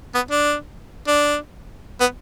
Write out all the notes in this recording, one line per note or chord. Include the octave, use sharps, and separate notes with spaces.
B3
D4
D4
B3